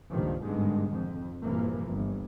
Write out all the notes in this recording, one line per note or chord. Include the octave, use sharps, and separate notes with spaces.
C#2 G2 A#2 D#3 F3
G#1 G2 B2 D3 D#3 G#3
F2
A#1 G2 C3 E3 F3 A#3
G1 G2